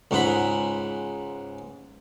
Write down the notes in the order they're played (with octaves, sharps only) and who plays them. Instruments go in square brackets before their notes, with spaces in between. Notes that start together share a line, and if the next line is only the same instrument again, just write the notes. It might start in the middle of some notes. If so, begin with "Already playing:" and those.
[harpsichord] C#2 G#2 F#5 B5